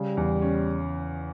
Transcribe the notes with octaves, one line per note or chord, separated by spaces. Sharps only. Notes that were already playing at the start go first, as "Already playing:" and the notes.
Already playing: C#3 G3
E2
C#4